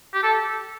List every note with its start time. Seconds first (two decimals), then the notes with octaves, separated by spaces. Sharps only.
0.14 G4
0.23 A4